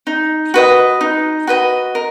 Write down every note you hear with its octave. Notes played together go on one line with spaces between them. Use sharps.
D#4
F#4 B4 D#5
D#4
F#4 B4 D#5
A#4